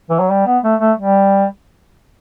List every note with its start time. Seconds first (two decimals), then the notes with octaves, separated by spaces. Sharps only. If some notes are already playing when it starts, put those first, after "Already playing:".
0.10 E3
0.19 F#3
0.30 G3
0.46 B3
0.63 A3
0.80 A3
0.98 G3